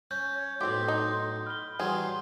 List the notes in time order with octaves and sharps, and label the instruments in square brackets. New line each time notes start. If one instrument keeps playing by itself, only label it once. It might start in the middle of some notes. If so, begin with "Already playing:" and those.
[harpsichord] C#4 [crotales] G6
[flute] C#5
[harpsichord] B1 A2 [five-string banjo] C4 G4 [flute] C6
[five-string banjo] D#4
[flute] B5 [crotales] F6 G6 G7
[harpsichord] E3 F#3 G3 [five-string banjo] G#4 [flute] C6